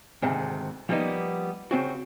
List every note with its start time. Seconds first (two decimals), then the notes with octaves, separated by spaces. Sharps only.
0.22 D2 G#2 C3 D#3
0.89 F3 G3 A#3 B3 D#4
1.71 C#3 C4 F#4